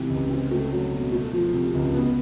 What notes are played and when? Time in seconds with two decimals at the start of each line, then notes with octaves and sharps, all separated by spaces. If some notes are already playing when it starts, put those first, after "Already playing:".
Already playing: C3 E3 A3
0.10 C#2
0.30 C4
0.51 A3
0.72 F#3
0.92 B2
1.12 A3
1.33 F3
1.53 C3
1.75 C#2
1.94 B3